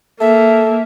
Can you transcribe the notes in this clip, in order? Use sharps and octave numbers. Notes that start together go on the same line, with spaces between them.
A#3 A4 E5